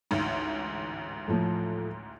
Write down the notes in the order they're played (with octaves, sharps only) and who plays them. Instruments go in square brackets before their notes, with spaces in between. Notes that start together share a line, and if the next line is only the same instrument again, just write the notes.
[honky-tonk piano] A1 D2 G#2
[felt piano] A2 F3 A3